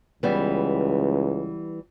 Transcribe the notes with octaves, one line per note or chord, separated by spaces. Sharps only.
C#2 E3 G3 B3